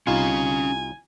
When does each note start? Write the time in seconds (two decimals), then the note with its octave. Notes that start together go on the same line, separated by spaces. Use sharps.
0.07 C2 C#4 D#4 F4 F5 G#5